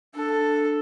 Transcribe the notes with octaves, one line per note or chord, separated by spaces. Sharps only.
D4 A4